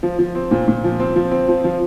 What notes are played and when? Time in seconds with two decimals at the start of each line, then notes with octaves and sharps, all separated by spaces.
0.03 F3
0.19 F3
0.35 C4
0.51 A#2
0.68 A#2
0.84 F3
1.00 C4
1.16 F3
1.31 C4
1.48 F3
1.64 F3